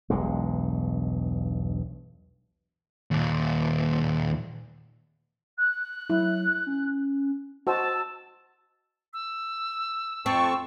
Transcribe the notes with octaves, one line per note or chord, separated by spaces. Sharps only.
E1 B1 G2 G#3
D#2 A#2
F#6
F#3 E4
C#4
F#4 C5 D#5 A5 E6
E6
F2 C4 A5 C#6